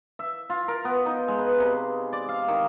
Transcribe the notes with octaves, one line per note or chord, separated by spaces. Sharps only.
E5
F4
A#4
B3
D#4
G#3
B4
C3
D5
F5
D#3